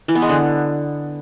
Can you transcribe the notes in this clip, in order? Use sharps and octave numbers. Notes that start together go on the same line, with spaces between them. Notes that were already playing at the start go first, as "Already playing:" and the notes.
E3
B3
G#3
D3